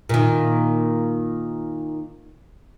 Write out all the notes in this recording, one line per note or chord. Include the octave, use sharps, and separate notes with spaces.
A#2 D#3